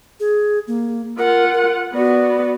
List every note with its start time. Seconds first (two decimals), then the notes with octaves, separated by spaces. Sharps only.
0.20 G#4
0.67 A#3
1.18 F4 A#4 F#5
1.53 A#4
1.94 B3 F#4 D5